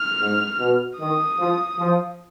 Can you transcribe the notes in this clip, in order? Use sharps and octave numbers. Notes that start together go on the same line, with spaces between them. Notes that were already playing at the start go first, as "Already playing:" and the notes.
Already playing: F6
G#2
B2
D#3 D#6
F3
F3